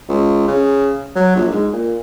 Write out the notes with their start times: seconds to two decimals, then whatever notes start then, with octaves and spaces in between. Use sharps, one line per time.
0.09 C#2
0.48 C#3
1.16 F#3
1.36 A#1
1.51 G#2
1.73 A#2